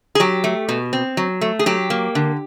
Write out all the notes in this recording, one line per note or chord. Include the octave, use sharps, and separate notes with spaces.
G#4
F#3 G4
A3
B2
C4
F#3
A3
G#4
F#3 G4
A#3
D3